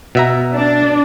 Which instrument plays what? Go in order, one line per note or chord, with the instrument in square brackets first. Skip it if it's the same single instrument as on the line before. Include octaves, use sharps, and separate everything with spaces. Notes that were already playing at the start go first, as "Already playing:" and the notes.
[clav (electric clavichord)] B2 E5 A#5
[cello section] D4